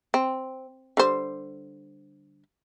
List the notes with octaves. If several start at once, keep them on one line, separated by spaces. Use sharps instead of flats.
C4
D3 G3 C5